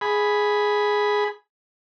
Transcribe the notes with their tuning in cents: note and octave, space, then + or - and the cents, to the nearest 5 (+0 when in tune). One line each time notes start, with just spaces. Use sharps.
G#4 +5 B5 +0